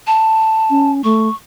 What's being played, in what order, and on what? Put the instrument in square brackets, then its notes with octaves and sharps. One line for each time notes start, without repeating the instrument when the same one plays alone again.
[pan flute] A5
[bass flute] C#4
[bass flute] A3 [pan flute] C#6